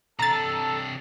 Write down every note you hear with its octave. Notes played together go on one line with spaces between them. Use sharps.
C3 D4 A4 A#5 A6